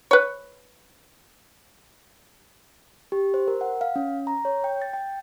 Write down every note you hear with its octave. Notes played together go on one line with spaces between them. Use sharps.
B4 C#5
G4
C5
A#4
F#5
F5
C#4
A#5
C#5
G5
A6
G5